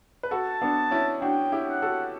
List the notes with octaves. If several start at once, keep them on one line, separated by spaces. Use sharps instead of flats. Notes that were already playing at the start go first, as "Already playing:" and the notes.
B4
F#4 A4 A5
B3 D4
C#4 E4
D4 F#4 G5
E4 G4
F#5
F#4 A4